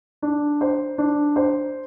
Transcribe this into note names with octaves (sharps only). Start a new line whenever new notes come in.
D4
C5
D4
C5